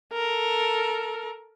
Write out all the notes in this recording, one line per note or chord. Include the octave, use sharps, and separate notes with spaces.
A4 A#4